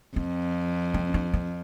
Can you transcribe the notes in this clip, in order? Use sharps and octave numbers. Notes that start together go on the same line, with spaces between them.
F2 C4
C4
D4
C4